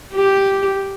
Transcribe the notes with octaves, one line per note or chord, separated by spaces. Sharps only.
G4